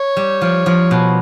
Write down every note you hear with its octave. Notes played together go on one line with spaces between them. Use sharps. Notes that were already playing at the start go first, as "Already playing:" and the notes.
Already playing: C#5
G3
F3
F3
B2